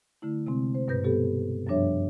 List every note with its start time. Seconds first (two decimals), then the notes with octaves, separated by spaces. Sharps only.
0.22 D3 A3 E4
0.46 C3 G#3 C4
0.75 C5
0.88 G2 B2 B4 G6 A#6
1.04 G3 B3 G4 A4
1.67 F#2 F3 G3 D4 C#5 E5